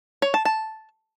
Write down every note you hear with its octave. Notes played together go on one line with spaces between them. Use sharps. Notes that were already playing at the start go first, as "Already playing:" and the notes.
C#5
A5
A5